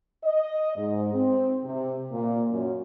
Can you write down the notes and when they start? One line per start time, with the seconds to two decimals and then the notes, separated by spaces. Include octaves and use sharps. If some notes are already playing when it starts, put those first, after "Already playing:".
0.24 D#5
0.76 G#2
1.14 C4
1.64 C3
2.11 A#2
2.49 F#2